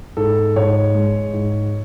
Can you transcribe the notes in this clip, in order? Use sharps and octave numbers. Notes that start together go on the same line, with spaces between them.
G#2 A4
G#2 C#5
G#3
G#2